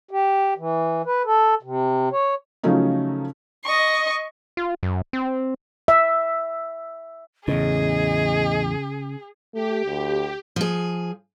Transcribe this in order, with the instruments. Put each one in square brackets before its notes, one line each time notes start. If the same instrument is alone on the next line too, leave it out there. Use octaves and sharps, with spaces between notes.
[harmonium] G4
E3
B4
A4
C3
C#5
[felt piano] C#3 F3 F#3 A3 C#4 D#4
[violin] D#5 C#6
[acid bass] F4
F#2
C4
[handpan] E5
[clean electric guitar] E2 A2 [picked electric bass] C#3 [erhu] G#4 [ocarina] D#5
[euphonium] A3 [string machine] G4
[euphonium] D2
[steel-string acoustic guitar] F3 G#4